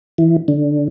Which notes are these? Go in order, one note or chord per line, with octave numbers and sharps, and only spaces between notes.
E3
D3